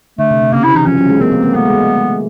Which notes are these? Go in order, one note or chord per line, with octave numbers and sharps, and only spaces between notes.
D3 A3
C3
C3
C#3 A#3
E4
E3 D#4
F3 C#4
F#3
G#3
A#3 C4
B3
A#3
A3 B3
G#3